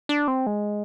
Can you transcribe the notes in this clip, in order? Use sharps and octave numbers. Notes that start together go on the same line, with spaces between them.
D4
C4
G#3